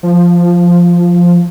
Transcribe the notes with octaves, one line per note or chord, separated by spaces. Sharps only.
F3